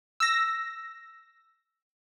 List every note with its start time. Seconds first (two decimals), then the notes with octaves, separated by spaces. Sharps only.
0.20 E6 A#6